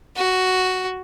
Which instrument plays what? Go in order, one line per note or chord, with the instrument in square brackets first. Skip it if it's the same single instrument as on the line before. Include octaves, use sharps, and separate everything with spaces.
[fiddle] F#4